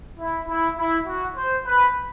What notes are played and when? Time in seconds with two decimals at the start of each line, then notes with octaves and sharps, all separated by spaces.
0.19 E4
0.48 E4
0.78 E4
1.07 F#4
1.37 C5
1.67 B4